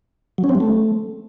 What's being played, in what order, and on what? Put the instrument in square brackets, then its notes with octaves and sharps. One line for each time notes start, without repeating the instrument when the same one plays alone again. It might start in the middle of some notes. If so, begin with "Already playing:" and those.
[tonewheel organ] F#3
C#4
C4
G3
A3